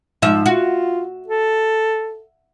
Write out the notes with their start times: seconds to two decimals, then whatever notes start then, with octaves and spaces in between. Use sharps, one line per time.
0.22 G#2 F3 E5
0.46 F4 F#4
1.28 A4